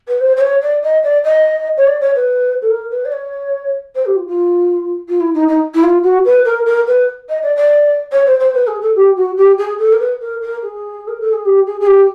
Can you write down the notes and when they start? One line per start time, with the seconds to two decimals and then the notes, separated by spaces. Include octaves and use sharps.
0.08 B4
0.20 C5
0.36 C5
0.40 C#5
0.62 D5
0.82 D#5
1.03 D5
1.24 D#5
1.77 C#5
1.87 D5
2.01 C#5
2.15 B4
2.62 A4
2.70 A#4
2.90 B4
3.05 D5
3.12 C#5
3.95 C5
4.05 G4
4.16 F4
4.27 F4
5.08 F4
5.20 E4
5.34 D#4
5.48 D#4
5.74 E4
5.83 F4
6.03 F#4
6.25 B4
6.45 A#4
6.65 A#4
6.87 B4
7.28 D#5
7.42 D5
7.56 D5
8.12 C#5
8.26 C5
8.39 C5
8.54 B4
8.67 G#4
8.81 A4
8.95 G4
9.16 F#4
9.37 G4
9.58 G#4
9.78 A4
9.92 A#4
9.99 B4
10.20 A#4
10.41 A#4
10.62 G#4
11.07 A#4
11.20 A4
11.33 G#4
11.45 G4
11.67 G#4
11.80 G#4
11.86 G4